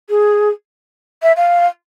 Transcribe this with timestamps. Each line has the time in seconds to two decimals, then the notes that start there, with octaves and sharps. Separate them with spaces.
0.09 G#4
1.22 E5
1.36 F5